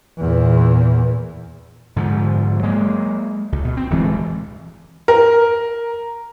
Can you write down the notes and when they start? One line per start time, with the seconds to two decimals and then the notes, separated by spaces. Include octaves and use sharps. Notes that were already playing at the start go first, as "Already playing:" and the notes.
0.18 E2 A#2
1.96 G#2 D3 F3
2.63 F#3 G#3 A#3
3.52 C#2
3.65 B2
3.77 C4
3.90 D1 G2 E3 G#3
5.08 A#4